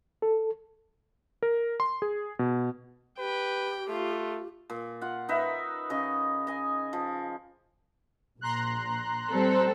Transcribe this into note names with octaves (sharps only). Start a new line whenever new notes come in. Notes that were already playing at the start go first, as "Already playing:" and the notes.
A4
A#4
C6
G#4
B2
G4 B4 G5
A3 F4
A#2
F4 F#5
D#4 B4 E5
C#3 D#5 C#6
D#5 G#5
F3
A#1 A#5 C6 F#6
G3 C4 A4